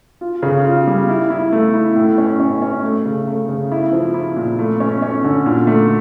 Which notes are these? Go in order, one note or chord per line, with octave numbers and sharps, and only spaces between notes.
F4
C#3
F4
G3
E4
E4
A3
E4
A2
C#4
C#4
C#4
A3
C#3
A3
C#3
E4
F3
E4
A#2
A3
C#4
C#4
D3
A#2
A3